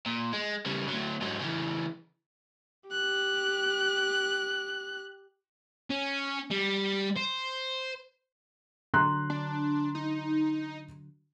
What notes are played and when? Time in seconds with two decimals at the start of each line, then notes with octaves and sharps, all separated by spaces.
0.06 A#2
0.33 G#3
0.66 C#3 G3
0.88 D2 F#3
1.21 G#2 F#3
1.41 C#3 E3
2.90 G4 F#6
5.90 C#4
6.51 G3
7.16 C5
8.94 D3 F#3 A#5 C6 F#6
9.30 D4
9.95 D#4